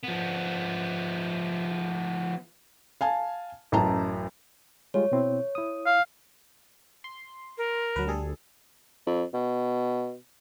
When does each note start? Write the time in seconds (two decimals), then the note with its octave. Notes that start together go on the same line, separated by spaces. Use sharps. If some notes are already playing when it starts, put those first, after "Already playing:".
0.03 F3 B3
3.01 F5 G#5 A5
3.72 A1 F#2 A5 A#5
4.94 G3 G#3 F4 C#5
5.12 B2 C4 E4
5.55 E4 D#6
5.86 F5
7.04 C6
7.58 A#4
7.96 D2 F#3 B4
8.07 G3 G#4 A4
9.07 F2
9.34 B2